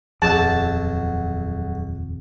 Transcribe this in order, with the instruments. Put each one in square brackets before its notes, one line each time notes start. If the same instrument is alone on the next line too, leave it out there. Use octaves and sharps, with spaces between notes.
[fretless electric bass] D#1 F2 [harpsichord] B1 F#3 [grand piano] G#4 [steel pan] A5